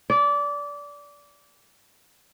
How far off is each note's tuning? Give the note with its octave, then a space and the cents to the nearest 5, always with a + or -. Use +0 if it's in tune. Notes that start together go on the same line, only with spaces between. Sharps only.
D5 -20